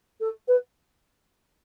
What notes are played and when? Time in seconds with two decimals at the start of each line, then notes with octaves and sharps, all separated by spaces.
0.21 A4
0.48 B4